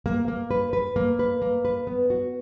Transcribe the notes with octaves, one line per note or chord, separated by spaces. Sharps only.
A#3
A#3
B4
B4
A#3
B4
A#3
B4
B3
F#4